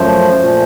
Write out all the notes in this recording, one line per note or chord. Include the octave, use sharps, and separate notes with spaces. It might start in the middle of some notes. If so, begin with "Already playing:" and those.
Already playing: F#2 F3 A3 C5
A#2 F3 A3